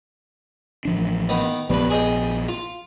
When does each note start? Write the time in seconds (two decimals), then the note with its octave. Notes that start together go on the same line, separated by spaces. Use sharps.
0.85 A1 F3 D4
1.29 D#3 B3
1.70 A#1 G2 F3 B3 B4
1.90 G#4 D#5 G5
2.48 F4